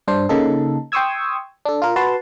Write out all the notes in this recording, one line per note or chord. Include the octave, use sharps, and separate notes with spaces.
G2 D4 C5
C#3 A#3 D#4 A4
G5 C6 C#6 D#6 E6 G#6
D4 A4
F4 A#4
F#4 B4 A5 C6